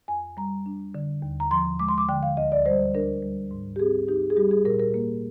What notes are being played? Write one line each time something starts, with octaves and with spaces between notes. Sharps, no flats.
F2 G#5
G3 A#5
D4
D3
D#2
A#5
F3 C6
G#3 D6
C6
D6
D3 G5
F5
D2 D#5
D5
G3 C5
D4 A#4
G3
G#2
G4
C4 G#4
D#4 G4
G#4
G3 G4
G#4
A#2 A#4
A#4
A#3